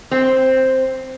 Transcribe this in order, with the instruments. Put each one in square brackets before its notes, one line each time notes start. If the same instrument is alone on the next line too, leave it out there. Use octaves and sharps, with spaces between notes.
[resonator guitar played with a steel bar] C4